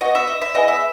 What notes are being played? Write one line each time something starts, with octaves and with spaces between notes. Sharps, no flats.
B3 D#4 F#4 D#5
E5
D#5
E5
B3 E4 G#4 D#5
E5